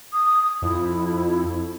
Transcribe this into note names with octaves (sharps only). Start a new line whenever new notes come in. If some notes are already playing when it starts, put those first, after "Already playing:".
D#6
F2 E4